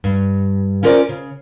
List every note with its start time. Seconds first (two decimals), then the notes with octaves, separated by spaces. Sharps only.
0.04 G2
0.83 C#4 E4 F4 A#4 C5 D5
1.09 C#3